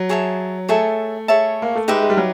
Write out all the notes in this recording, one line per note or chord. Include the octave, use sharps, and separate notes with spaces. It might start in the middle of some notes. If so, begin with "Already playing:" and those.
Already playing: F#3
G#4 C#5 E5 A5
A3 G#4 C#5 E5 A5
G#4 C#5 E5 A5
A#3
A3
G#3 D#4 G4 B4 E5
G#3
G3
F#3